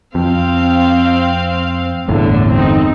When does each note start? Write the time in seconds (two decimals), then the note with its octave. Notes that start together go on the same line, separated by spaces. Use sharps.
0.15 F2 C4 F5
2.09 G1 E2 A2 D3
2.53 C4 D#4